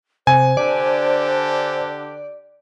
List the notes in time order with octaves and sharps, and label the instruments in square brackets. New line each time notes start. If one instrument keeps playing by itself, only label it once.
[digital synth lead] C3 [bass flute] C5 [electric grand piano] G#5
[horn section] D3 D4 G4 [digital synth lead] D5